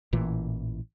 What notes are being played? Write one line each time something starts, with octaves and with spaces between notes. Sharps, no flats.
A1 A#2 E3